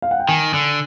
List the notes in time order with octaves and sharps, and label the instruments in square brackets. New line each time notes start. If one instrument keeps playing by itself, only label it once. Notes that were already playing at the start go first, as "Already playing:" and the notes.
[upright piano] F5
F#5
G5
[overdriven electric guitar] D#3 [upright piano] G#5
[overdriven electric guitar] D3